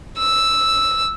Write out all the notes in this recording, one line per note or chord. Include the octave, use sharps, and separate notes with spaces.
E6